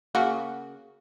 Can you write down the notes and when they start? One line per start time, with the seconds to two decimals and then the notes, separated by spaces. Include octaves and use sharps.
0.15 C#3 A#3 F#4